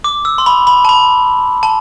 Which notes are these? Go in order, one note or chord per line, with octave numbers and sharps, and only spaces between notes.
D6
E6
C6
B5
B5
A5
B5
A5